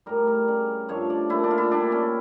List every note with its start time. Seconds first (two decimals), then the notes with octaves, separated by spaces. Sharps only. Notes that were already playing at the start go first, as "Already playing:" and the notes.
0.06 A2 G3 A#4
0.27 A#4
0.48 C#3 G3
0.89 G2 F3 A3 C#5
1.10 D5
1.29 A#2 A3 E4
1.44 D4
1.51 F4
1.58 E4
1.70 A#2 G3 D4
1.92 C#4